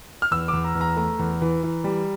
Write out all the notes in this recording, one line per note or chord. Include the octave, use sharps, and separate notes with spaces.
F6
E2 E6
E2 D6
A#5
E2
A#5
A3 A#5
E2
E3
E3
G3